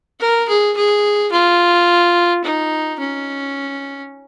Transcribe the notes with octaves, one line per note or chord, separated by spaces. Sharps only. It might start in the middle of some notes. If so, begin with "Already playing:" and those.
A#4
G#4
G#4
F4
D#4
C#4